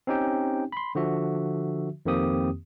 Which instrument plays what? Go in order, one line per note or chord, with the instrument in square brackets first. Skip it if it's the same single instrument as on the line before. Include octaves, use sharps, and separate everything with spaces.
[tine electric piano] C4 C#4 D#4 G4 G5
B5 C6
D3 F3 F#4 E5
F2 D#3 A#3 C4 G4 D#6